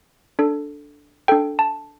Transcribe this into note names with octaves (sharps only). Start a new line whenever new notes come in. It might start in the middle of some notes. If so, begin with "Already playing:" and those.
D4 A4
D4 A4 G5
A5